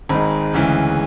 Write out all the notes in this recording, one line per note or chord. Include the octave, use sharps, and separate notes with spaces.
G#1 G#2 G#3 B5
D2 C#3 E3 G#3